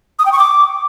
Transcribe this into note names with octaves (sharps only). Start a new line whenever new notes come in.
D#6
G5
C#6
D6